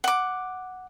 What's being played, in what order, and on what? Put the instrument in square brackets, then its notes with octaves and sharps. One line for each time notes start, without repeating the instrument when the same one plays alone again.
[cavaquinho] F#5 D6